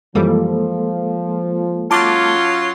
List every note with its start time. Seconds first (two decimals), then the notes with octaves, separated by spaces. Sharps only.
0.15 F#2 E3 F3 G3 G#3 A#3 A4
1.91 F#3 C#4 F4 A5 D6